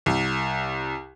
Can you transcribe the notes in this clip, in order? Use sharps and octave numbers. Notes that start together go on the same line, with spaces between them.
C2